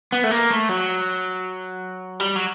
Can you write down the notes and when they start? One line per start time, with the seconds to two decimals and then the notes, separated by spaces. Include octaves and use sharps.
0.12 B3
0.24 A3
0.31 A#3
0.50 A3
0.69 F#3
2.20 G3
2.36 F#3